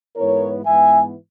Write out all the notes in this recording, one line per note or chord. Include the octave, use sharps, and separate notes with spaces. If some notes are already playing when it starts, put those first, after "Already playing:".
G#2 E3 B3 E4 A#4 C#5
G#2 E3 B3 E5 G#5